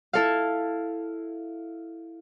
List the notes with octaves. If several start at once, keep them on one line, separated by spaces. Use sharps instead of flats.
E4 A4 F5